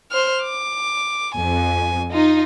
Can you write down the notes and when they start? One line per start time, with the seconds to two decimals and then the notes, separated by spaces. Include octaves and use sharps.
0.11 C5 F6
0.43 D6
1.36 F2 G#5
2.12 D#4 F4